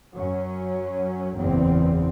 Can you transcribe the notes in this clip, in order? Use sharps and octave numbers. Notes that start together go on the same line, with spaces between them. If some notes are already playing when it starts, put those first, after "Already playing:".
F#2 F#3 C#4
F#1 E2 A#2 C4